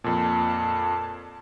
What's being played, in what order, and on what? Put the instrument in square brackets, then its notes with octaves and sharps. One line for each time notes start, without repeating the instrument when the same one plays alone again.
[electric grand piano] F2 A#2 [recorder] A5